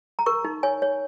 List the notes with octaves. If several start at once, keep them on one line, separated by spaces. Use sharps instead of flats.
A#5
A#4 C#6
D#4
C#5 G#5
C#5